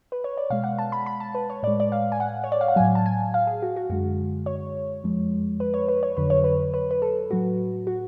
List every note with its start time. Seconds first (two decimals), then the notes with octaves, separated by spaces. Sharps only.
0.12 B4
0.24 C#5
0.37 D5
0.50 B2 G#3 F5
0.64 F#5
0.78 A5
0.92 B5
1.06 B5
1.20 A5
1.35 B4
1.50 C#5
1.63 A2 D5
1.67 G#3
1.80 D5
1.92 F5
2.12 G#5
2.20 F#5
2.44 C#5
2.52 D5
2.61 F5
2.68 F#5
2.76 A2 F#3 G#5
2.95 A5
3.06 G#5
3.34 F5
3.47 G#4
3.62 F#4
3.76 F#4
3.90 F#2 D3 G#3 F#4
4.46 C#5
5.04 F2 F3 G#3
5.60 B4
5.74 C#5
5.88 B4
6.03 C#5
6.17 F2 D3 F#3 B4
6.30 C#5
6.44 B4
6.74 B4
6.91 B4
7.02 A4
7.30 A2 F#3 F#4
7.87 F#4